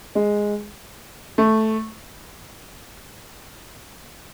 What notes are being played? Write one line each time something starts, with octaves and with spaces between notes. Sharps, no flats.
G#3
A3